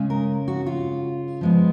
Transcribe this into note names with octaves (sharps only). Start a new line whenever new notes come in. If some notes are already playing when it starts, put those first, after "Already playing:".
Already playing: C#3 G#3 C#4
A#4
F#4
F4
F3 G#3 B3